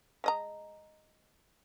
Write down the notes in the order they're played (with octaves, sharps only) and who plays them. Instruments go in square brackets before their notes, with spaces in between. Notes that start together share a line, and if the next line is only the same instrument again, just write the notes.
[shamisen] G#3 D#5 A#5